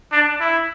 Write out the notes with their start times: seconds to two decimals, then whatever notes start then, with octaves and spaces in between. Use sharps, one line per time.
0.12 D4
0.41 E4